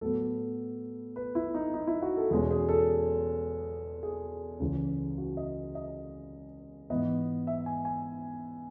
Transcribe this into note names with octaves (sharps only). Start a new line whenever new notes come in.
A2 F#3 B3 A4
B4
E4
D#4
D#4
E4
F#4
A4
E2 B2 G#3 C#4 G#4
G#4
A4
G#4
C#2 C#3 E3
F#4
D#5
D#5
G#2 E3 B3 D#5
E5
G#5
G#5